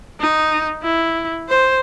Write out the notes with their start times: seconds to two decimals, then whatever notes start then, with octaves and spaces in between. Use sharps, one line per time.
0.20 D#4
0.83 E4
1.49 C5